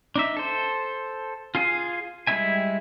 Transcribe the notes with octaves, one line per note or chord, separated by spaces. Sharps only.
D4 D#4 E5
A4 C5
F4 G#4 F5 G#5
G3 G#3 E4 E5 G#5